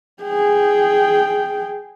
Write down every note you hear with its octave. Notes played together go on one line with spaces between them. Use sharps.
G#4 G5